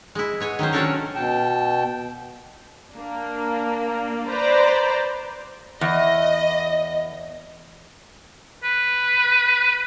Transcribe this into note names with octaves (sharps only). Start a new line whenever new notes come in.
G#3 E4
B3 C#5 G#5
D#3 F#3 C#4 C5
C#4 D4 F#4 A4 A#4 C#5
B2 G5 A5
A#3 D4
B4 C5 D5 A#5
E2 D#5
B4